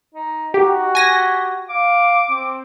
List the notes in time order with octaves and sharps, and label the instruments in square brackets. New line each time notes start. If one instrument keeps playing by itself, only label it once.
[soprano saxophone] D#4
[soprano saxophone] D#4 [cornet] F#4 [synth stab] G4
[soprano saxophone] G4 [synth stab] G#5 A#6
[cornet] F5 [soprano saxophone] D6
[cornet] C4